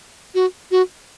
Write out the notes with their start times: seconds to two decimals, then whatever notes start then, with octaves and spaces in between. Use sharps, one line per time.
0.35 F#4
0.71 F#4